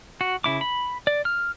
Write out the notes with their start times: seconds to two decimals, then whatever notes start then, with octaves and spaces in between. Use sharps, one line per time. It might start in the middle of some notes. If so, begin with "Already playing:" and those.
0.21 F#4
0.44 C#3 E4 D6
0.61 B5
1.07 D5
1.25 F6